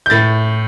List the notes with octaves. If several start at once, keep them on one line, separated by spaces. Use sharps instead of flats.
G6
A2 A6